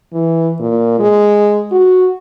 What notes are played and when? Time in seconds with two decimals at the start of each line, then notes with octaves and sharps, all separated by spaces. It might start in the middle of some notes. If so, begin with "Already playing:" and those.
0.13 E3
0.60 A#2
0.99 G#3
1.72 F#4